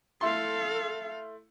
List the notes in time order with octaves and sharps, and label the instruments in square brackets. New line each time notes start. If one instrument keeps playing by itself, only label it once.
[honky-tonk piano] A3 E4 C6 [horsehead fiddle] A4 F5